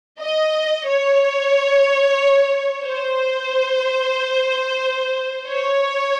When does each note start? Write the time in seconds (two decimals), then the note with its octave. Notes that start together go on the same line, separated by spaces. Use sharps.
0.20 D#5
0.86 C#5
2.85 C5
5.48 C#5